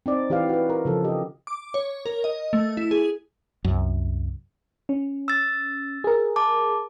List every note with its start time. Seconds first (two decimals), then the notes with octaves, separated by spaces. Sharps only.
0.06 C4 D#4 D5
0.30 E3 G4 B4 D5 F5
0.49 F#4 B4
0.70 A#4
0.85 C#3 F3 A4
1.04 G4 D#5
1.47 D6
1.74 C#5
2.06 A#4
2.24 D#5
2.53 A3
2.77 E4
2.91 G#4
3.64 C2 F#2
4.89 C#4
5.28 E6 A6
6.04 G#4 A#4
6.36 A5 D6